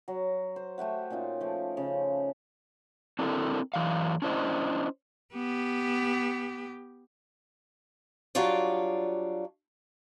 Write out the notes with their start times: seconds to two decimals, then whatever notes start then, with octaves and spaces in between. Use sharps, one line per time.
0.08 F#3
0.56 C5
0.78 A3 G4 E5 F#5
1.10 A#2 C#4 D#4 F4
1.41 F3 A3
1.77 C#3
3.19 C4 D4 E4 A4 A#4
3.74 F#2 E3 D5 F5
4.22 C#4 D4 E4 C5 D5 D#5
5.34 B3 G4
8.35 F#3 G3 D4 F4 C#5 D5